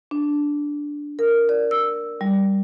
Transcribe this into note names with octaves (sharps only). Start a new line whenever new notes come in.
D4
A#4
D5
E6
G3